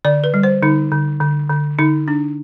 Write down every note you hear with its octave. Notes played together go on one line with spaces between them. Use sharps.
D3 D5
B4
G3
C5
D3 D#4
D3
D3
D3
D3 D#4
D4